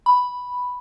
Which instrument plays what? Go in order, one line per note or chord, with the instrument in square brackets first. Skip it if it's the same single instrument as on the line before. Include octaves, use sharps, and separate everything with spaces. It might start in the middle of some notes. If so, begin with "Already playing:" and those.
[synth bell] B5